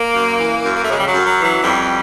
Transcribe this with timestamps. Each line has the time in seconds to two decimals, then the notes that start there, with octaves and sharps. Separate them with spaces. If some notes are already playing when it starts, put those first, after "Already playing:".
Already playing: A#3
0.13 F#2
0.38 E3
0.63 F#2
0.77 A#3
0.85 A3
0.89 C#3 G#3
0.99 G3
1.08 F#3
1.14 F#2
1.27 F#3
1.39 E3
1.45 F#3
1.64 F2 G3